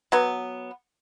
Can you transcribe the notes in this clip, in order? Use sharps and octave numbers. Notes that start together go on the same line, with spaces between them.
F#3 B3